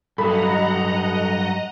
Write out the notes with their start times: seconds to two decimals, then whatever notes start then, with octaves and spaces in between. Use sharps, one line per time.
0.18 G2 F#3 A4 D#5 F#5 A#5 B5